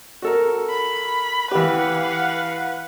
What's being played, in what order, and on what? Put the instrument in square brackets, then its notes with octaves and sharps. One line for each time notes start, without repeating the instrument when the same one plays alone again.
[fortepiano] F#4 A4 A#4
[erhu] B5
[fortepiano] E3 G4 [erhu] B4 [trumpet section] F5 F#5